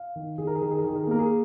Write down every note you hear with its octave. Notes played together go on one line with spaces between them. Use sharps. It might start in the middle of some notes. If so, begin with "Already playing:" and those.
Already playing: F5
D#3
D#3 G#4
A#4
G#4
D#3 A#4
G#4
A#4
D#3 G#4
A#4
G#4
A#3 A#4
G#4